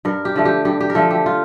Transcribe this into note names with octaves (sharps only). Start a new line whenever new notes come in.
G2 A#4
G4
D3 F3 A3
G4
G2 G4
G4
A#4
D3 F3 A3 A4
G4
F4